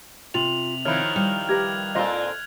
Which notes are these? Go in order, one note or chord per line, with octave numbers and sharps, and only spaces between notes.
C3 F4 F7 F#7
D#3 F3 E4 C#5 F6 F#6
G3
G4 A#4 B4 G#6
A#2 C4 F4 A4 D#5